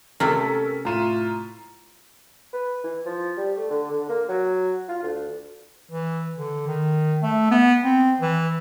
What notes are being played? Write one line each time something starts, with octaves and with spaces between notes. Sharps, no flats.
C3 A3 A#3 C#4 A4 A#4 G5 B6
A2 F4 A#5 D#7 E7
B4
E3
F3
G3
A3
D3
D3
A#3
F#3
F4
D2
E3
D3
D#3
A3
B3
C4
E3